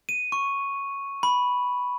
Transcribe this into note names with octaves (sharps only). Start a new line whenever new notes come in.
D#7
C#6
B5